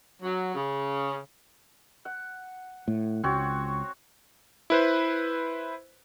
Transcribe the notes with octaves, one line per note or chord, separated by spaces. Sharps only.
F#3
C#3
F#5
A2
C#2 C4 F#4 C#5
E4 B4 C5